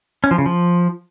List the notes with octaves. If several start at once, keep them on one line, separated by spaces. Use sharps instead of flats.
C#4
F3
C#3
F3